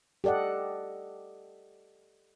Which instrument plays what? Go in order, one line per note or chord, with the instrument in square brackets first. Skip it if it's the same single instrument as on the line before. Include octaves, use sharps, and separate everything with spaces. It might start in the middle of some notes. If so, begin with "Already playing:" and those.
[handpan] G4 A4 D5 D#5 F#5